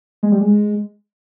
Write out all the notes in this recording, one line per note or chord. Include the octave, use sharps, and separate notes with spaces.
G#3
G3
G#3